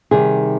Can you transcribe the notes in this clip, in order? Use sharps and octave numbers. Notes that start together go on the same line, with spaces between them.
C3 D#3 G3 G#4